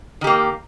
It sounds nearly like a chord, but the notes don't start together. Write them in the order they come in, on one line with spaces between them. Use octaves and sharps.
D#3 G4 A#3